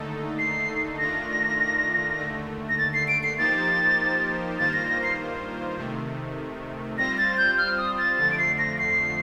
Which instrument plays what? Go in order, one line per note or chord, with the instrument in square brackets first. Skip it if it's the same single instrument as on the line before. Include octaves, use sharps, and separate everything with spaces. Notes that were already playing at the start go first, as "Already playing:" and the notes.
Already playing: [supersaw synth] D#2 D3 A3 D#4 A4
[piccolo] C7
[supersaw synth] D#3 A3 D4 F4 [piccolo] A#6
[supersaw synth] D#2 D3 A3
[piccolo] A#6
A6
C7
D7
C7
[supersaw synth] F3 A#3 D#4 G4 C5 [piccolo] A6
[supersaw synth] G2 D#3 A#3 F4 C5 [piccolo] A6
[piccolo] A#6
A#6
C7
[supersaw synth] C3 D#3 A3
[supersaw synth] G3 C4 F4 C5 [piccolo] A#6
[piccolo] A6
G6
F6
D#6
A6
[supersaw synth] F2 D3 F3 A3 [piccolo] A6
[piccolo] D7
C7
A#6
C7